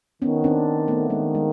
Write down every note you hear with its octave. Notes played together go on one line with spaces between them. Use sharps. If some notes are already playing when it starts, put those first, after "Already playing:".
D#3 B3 C#4
C4 D4
A3 B3
D#3 G#3 A#3
G#3